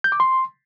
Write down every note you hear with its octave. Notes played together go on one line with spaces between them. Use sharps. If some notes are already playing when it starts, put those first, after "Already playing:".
G6
D6
C6